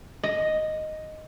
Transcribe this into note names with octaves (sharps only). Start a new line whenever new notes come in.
D#5